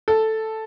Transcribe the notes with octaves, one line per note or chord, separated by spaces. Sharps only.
A4